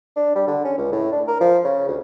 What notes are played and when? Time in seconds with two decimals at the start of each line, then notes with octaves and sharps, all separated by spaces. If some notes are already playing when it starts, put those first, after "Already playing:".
0.16 D4
0.35 G3
0.48 D3
0.65 C#4
0.78 C#2
0.92 A2
1.12 D4
1.28 A#4
1.41 F3
1.64 C#3
1.88 D2